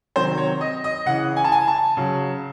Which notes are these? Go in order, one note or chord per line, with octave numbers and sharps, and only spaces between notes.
C3 D#3 F#3 C5
C#5
D#5
D#5
C#3 E3 F#5
G#5
A5
G#5
A5
C#3 F#3